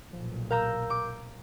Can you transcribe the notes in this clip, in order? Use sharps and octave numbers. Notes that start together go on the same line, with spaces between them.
B1 A#2 F3
A#4 F5 A#5 E6 G6
D6